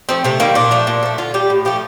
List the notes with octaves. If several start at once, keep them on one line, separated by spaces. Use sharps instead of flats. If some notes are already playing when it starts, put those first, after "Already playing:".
F3 A3 C4
C3 A3
D#3 G3 A#3
A#2 D4
F3 A3
A#2
F3 A3
D3 F4
G3 G4
A2
F3 A3 G4